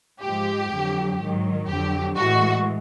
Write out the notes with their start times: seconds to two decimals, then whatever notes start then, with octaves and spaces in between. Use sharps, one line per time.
0.22 G#2 F3 G#3 G4
0.72 F2 D3 F#3
1.20 G#2 D#3 F#3
1.69 F2 D3 F#3 G4
2.18 A2 E3 G#3 F#4